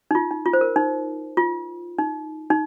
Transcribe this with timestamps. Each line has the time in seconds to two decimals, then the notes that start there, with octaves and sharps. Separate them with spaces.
0.11 D#4
0.15 F4
0.31 D#4
0.45 F4
0.53 C5
0.61 A#4
0.76 D#4
1.37 F4
1.99 D#4
2.50 D#4